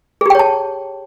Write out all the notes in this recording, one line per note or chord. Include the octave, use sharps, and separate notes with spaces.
G4 G#4 C#5 G5 A5